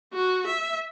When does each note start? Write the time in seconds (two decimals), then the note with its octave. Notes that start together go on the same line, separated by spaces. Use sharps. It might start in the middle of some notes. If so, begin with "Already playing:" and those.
0.14 F#4
0.47 E5